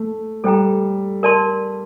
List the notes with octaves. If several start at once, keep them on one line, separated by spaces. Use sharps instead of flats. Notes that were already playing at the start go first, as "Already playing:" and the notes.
Already playing: A3
G3 A4 C5 G5 A#5
A#4 D5 A5 C6